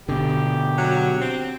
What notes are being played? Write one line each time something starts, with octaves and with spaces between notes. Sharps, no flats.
B2 D3 G4
F#3
C4